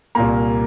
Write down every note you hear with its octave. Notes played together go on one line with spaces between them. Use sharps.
C2 A#2 A#3 A#5